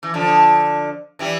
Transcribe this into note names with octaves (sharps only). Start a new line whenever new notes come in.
E3
D3 F3
E3 G3